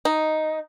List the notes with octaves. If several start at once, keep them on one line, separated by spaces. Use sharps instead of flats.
D#4